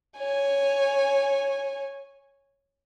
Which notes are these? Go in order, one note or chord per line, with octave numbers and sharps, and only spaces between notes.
C#5 G#5